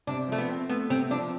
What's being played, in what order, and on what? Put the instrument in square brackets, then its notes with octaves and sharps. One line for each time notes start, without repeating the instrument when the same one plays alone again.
[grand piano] C3 [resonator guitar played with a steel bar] D4
[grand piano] F3 [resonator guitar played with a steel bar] A3
[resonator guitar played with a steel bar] B3
[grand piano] C4
[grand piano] A3 [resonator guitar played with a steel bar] B3
[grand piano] C3 [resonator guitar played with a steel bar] C4
[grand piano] F3 [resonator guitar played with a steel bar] D4